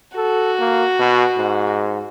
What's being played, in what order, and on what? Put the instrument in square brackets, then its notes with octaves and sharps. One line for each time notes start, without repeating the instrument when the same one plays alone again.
[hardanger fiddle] F#4 [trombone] A4
[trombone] A#3
B2
G#2